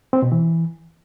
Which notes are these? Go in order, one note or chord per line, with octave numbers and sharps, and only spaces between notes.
C4
B2
E3